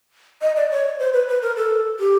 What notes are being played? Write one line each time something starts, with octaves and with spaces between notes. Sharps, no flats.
D#5
D5
C#5
C5
B4
B4
A#4
A4
G4